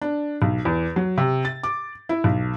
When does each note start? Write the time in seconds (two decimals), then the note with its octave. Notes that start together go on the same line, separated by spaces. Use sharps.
0.01 D4
0.42 B1
0.65 E2
0.96 F#3
1.18 C3
1.45 A6
1.63 D6
2.09 E4
2.24 B1